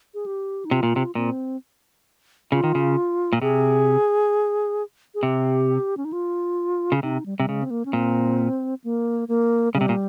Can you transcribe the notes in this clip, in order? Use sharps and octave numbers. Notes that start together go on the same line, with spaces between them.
G#4
G4
D#4
C3 F4
A#2
C3
A#2 C4
C#3 F4
D#3
C#3
A#2
C3 G#4
G#4
C3 G4
C#4
D#4
F4
C#3
C3 D#4
G3
C3 G3
C#3 G#3
C4
A#3
C#4
A#2 C4
A#3
A#3
C#3 G3
C3
A#2